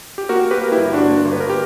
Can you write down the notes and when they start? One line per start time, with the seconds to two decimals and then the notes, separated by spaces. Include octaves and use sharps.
0.18 G4
0.29 A#3 F#4 A#4
0.45 A#3
0.51 G4 B4
0.61 A#3 A#4
0.72 E4 G4
0.77 G1
0.93 G1 D4 F#4
1.10 A#3
1.25 G1
1.32 B4
1.40 A#4
1.50 G4